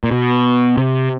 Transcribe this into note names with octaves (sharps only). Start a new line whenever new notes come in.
A#2
B2
C3